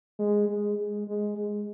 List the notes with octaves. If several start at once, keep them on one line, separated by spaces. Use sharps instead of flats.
G#3
G#3
G#3
G#3
G#3